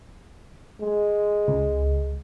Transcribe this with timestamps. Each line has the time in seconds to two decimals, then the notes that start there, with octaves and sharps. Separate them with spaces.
0.80 G#3
1.48 C#2